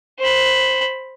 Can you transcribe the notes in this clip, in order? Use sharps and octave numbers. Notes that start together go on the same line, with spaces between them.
C5 B5